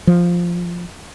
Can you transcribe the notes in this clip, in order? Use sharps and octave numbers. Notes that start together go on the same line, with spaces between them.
F3